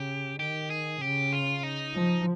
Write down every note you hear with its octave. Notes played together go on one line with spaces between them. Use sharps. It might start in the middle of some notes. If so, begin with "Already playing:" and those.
Already playing: C#3 G4
D#3 G4
G#4
C#3 G4
F4
D#4
F3